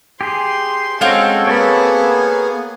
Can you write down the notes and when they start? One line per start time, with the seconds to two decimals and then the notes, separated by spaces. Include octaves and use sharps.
0.21 G4 G#4 C6
1.01 G#3 C4 C#4 F#4 A4 F5
1.47 A#3 B3 G#4 C#5 A5 B5